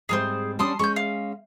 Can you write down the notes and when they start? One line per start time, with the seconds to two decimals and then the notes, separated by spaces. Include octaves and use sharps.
0.09 G#2 G3 C4 G#4 A#4 C5
0.59 G3 C#4 D4 A5 C6 D#6
0.79 G#3 C#4 C#6 G6
0.96 F5